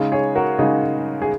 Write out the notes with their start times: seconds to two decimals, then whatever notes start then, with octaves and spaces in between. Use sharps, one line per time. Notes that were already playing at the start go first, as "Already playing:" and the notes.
Already playing: C#3 G#3 D#4
0.12 G#4 C#5
0.36 F#4 A#4
0.59 C#3 G#3 D#4 G#4
1.22 G#4